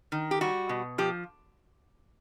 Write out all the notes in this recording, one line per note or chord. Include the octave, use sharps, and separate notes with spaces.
D#3
G4
G3 F#4
B2
F3 G4